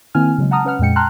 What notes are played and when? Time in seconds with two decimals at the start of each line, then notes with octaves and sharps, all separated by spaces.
0.15 D#3 A#3 C4 E4 G#5 F6
0.38 C#3 F#3 G#3
0.51 F#5 A5 A#5 D#6 F6
0.65 C#4 B4 F#5 F6
0.79 F2 A#2 G#3 G5 C#7
0.96 G5 A5 A#5 C6 F6 F#6